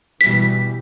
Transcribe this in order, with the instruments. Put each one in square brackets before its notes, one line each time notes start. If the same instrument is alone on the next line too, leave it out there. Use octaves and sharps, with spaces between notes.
[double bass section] B2 E3 G3 [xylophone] B6